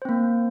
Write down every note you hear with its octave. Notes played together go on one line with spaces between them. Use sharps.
A#3 C4 C5